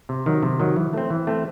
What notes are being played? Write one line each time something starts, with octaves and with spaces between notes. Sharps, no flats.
C3
D#3 F#3
C3
D#3 F#3
E3
A3 C4
E3
A3 C4